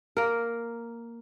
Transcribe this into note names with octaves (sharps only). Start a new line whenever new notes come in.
A#3 A#4